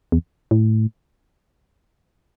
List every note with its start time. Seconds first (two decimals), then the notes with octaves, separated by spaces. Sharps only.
0.12 E2
0.51 A2